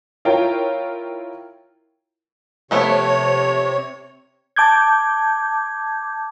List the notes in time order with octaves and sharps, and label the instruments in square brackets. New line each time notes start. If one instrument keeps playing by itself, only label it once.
[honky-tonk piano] E4 F4 A#4 C#5 G5
[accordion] C3 C#5 [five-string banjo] F3 A3 B3
[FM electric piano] A5 D6 G6 G#6